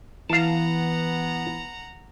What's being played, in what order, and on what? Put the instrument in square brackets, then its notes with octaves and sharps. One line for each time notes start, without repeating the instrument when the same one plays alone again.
[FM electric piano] E3 [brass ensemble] B3 [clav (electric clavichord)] F5 A5 [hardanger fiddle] F#5 A#5